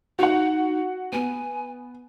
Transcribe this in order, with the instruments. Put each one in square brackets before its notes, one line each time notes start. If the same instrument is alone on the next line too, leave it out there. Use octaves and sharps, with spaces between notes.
[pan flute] D#4 [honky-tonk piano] F#4 F#5
[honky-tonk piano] B3 [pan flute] G#5